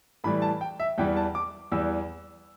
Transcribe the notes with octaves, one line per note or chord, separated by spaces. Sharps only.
A2 E3 G3 B5
A5
G5
E5
E2 E3 G3 G5
A5
D6
E2 E3 G3 E6